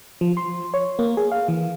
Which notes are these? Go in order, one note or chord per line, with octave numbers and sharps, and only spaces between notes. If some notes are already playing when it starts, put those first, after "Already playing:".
F3
C6
C#5
A#3
G#4
F5
E3